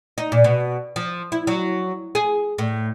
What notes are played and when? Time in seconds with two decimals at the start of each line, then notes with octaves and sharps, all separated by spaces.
0.18 D#4
0.32 A#2
0.44 B2
0.96 F3
1.32 E4
1.47 F#3
2.15 G#4
2.58 A2